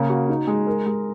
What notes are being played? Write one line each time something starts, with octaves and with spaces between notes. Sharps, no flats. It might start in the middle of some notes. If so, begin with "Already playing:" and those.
Already playing: C#3 A#3
F#4
D#4
G#3
A#4
G#3